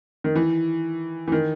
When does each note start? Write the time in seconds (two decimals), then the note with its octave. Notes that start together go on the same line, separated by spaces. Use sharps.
0.24 D#3
0.35 E3
1.28 E3
1.32 D#3